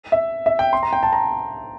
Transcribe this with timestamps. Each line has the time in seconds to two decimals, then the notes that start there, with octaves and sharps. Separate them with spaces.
0.12 E5
0.46 E5
0.59 G5
0.73 C6
0.83 A#5
0.93 G5
1.03 A5
1.13 A#5